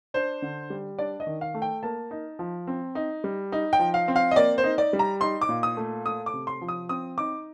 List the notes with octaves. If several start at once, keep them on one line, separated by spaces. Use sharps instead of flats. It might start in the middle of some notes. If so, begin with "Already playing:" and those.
D4 C5
D3
G3
D4 D5
D#5
D#3
F5
A3
G5
A#3 A5
D#4
F3
C4
D#4
G3
D#4
G5
F3
F5
C4
F5
D#5
A#3 D5
C5
D#4
D5
G3
A#5
D#4 C6
D6
A#2
D#6
A3
A3 D#6
D6
C3
C6
F3
D#6
C4 D#6
D#4 D6